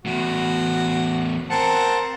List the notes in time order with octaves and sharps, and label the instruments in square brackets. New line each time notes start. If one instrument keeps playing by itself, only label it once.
[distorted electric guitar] E2 A2 [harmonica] F#4
[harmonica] C4 A#4 A5 [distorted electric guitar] F#5